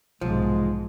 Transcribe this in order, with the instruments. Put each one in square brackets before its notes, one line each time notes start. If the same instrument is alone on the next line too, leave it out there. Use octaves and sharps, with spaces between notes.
[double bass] B1 G#2 [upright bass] C3 E3 [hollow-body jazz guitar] F3 [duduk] G#3